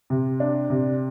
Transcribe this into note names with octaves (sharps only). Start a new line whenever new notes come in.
C3
D4
C3